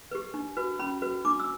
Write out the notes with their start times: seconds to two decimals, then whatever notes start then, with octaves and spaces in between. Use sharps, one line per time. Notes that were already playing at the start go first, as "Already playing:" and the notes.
0.11 G4 B4
0.34 D4
0.57 F#4 B4
0.79 C#4 B5
1.02 F#4 B4
1.25 D4 D6
1.39 E6